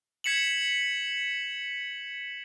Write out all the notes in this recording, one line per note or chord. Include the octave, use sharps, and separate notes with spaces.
G#6 B6 C#7 E7 F#7